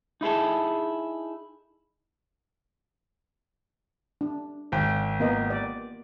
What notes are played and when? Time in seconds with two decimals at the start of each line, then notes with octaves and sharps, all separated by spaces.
0.21 D#4 E4 G#4 A4
4.21 D4
4.72 G#1 G5
5.20 A#3 B3 D#5
5.50 D5